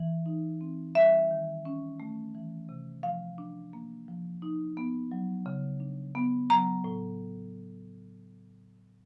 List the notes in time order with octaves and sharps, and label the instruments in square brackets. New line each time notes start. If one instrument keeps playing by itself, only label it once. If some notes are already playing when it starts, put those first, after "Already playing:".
Already playing: [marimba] E3
D#4
C4
G3 E5
D#3
C#4
A3
E3
C3
F3 F5
D4
A#3
F3
D#4
B3
F#3
C#3
D4
B3
F#3 A#5
A2